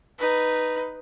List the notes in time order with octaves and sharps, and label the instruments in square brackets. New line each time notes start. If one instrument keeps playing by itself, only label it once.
[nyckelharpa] D#4 B4